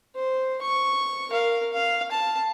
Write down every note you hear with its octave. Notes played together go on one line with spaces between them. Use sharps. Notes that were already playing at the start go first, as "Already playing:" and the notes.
C5
C#6
A#4 F5
F5
A5